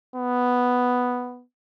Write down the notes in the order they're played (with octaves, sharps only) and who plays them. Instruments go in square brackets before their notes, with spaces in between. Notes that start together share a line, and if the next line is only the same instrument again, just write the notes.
[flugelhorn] B3